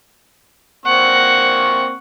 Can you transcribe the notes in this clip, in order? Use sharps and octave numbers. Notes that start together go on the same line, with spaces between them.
A#3 C4 F#5 C#6